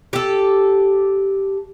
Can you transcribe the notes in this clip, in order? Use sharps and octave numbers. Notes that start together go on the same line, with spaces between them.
G4 A4